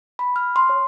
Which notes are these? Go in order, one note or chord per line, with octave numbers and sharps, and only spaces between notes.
B5
F6
C6
C#5